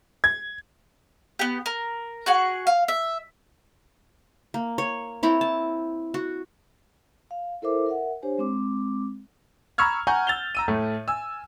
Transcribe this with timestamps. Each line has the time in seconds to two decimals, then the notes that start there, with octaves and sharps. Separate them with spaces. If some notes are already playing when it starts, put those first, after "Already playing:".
0.24 G#6
1.39 B3 G4
1.66 A#4
2.26 F#4 G#4 F#5
2.67 F5
2.88 E5
4.54 A#3
4.78 C#5
5.23 C4 E4 C#5
5.41 A5
6.14 F#4
7.31 F5
7.62 E4 A4 A#4 C5 E5 D6
7.86 A#4 E5 F#5
8.22 D4 G4 C5 C#5 G#5
8.38 G#3 C4 D6
9.78 A#5 B5 C#6 E6 F6 G#6
10.07 F#5 G#5 A#5 C#6 G6
10.27 E6 A6 F7 G7
10.55 A#5 E6 D#7
10.68 A2 A3
11.08 G#5 E6